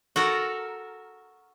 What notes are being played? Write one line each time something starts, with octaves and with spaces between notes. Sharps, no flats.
F#4 A4 A#4